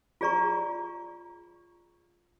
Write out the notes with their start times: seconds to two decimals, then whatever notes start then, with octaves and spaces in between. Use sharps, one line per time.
0.21 F4 G#4 D5 A#5 C#6